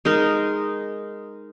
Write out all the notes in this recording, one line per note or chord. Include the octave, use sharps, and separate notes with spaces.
G#3 D#4 A#4